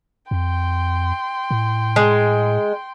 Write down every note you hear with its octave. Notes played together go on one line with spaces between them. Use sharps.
F2 G5 C6
A2
G#3